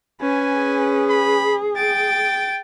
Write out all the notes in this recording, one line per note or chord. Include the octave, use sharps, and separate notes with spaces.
C#4 B4 G#5
G#4
B5
G5 A6 D7